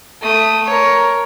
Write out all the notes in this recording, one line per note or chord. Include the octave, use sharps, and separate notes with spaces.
A3 D#6
A#4 C#5